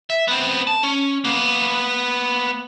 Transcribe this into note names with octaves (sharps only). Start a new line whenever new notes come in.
E5
B3 C4
A5
C#4
A#3 B3